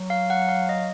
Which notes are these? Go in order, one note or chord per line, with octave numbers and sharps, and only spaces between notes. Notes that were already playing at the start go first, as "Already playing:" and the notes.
Already playing: F#3
F5
F#5
F5
D#5